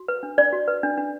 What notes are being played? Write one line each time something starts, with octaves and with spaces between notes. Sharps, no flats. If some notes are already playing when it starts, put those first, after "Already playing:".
Already playing: F#4
B4
D4
D4 D5
F#4
B4
D4
D4